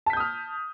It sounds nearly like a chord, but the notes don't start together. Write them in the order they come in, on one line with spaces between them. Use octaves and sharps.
A5 B6 G6 D#6 F6